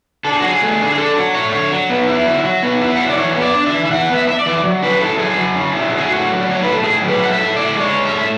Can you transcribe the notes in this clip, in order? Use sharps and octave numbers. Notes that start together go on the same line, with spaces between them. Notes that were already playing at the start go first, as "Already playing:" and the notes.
D4 A4
G#4
F#3 F#4
G#4
A3
D3
G#4
D4 A4
F#3
A3 C#5
D3 C#5
F#3
B3
E4
F#3
F#3
B3
E4
F#5
F#3 E5
D5
E3 C#5
B3
D5
D4
E5
E3
E5
E3 F#5
B3
E5
D4
E5
D5
E3
F#3
C#4 B4
E4 A4
F#3 G#4
F#3
C#4
E4
F#3
G#4
A2 F#4
F#3
D5
A3 C#5
A2 B4
A4
A2 G#4
F#3
B4
A3 F#5
E5
A2
E4 D5
G#3
C#5
C#4
E5
A2